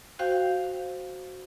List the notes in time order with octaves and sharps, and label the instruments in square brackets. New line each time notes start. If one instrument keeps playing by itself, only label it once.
[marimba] F#4 C5 F5 G5 G6